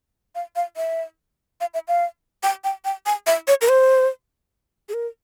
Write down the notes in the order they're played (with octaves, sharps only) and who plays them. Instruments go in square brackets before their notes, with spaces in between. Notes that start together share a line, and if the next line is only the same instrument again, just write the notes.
[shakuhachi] F5
F5
E5
F5
E5
F5
G5
G5
G5
G#5
E5
C#5
A#4
C5
G#4
A#4